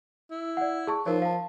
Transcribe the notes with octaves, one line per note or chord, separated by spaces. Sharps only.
E4
D5 F#5
G#4 A5 C#6
F3 D#4 A#4 C#5
F5 A5